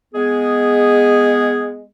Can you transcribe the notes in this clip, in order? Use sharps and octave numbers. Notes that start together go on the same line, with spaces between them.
G#3 B3 G#4